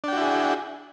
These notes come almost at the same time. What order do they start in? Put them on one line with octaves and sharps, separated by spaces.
D4 G5 F#4 E4 G#4